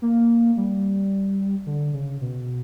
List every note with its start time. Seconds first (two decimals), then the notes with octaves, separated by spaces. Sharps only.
0.02 A#3
0.57 G3
1.66 D3
1.93 C#3
2.21 B2